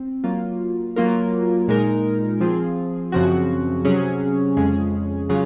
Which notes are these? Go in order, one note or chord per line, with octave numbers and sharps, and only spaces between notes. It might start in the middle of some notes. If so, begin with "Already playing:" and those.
Already playing: C4
F#3 A#3 F4
F#3 A#3 F4 A#4
A#2 G#3 D#4 A#4
F3 C4 F4 G#4
F#2 C#3 F3 C4 F#4
C3 F#3 C#4 G#4
F2 C#3 G#3 C#4 G#4
C#3 F#3 C#4 F4 G#4